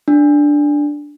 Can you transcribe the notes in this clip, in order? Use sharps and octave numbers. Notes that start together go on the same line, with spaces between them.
D4